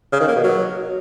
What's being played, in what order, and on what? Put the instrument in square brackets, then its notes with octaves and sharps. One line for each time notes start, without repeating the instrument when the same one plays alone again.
[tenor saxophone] C#3
D#3
A#3
B2
F#3